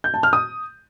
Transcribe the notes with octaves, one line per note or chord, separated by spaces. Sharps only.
G6
A5
F6
D#6